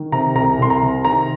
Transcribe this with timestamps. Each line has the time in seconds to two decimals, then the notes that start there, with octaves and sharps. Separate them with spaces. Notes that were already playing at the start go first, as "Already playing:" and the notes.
Already playing: D#3
0.12 C3 A#5
0.35 C2 A#5
0.59 C2 C6
0.70 A#5
0.82 C3
1.05 D#3 A#5